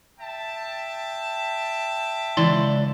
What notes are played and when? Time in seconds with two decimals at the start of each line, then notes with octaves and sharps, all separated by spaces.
0.19 E5 G5 A5
2.37 C#2 E3 D5 C6